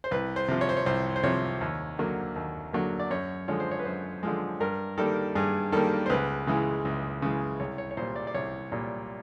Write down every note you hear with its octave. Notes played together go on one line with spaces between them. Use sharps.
C5
C2 B4
C5
C3 F3
C#5
C5
C#5
C2 C5
C5
C3 F3 C#5
D#2
D3 F#3 A#3
D#2
D3 F#3 A#3
D5
F#2 C#5
D3 F3 G#3 C#5
C5
C#5
B4
F#2 C5
D3 F3 G#3
G2 A#4
D#3 G3 A#3 A4
G2 G#4
D#3 G3 A#3 A4
C5
C#2 B4
C#3 E3 G#3
C#2
C#3 E3 G#3
C2 C#5
C#5
C#5
A#2 G3 C5
D5
D5
C2 C#5
A#2 G3